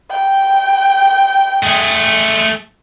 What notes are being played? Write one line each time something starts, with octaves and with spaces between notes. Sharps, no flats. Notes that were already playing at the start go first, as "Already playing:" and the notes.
G5
A3 G#4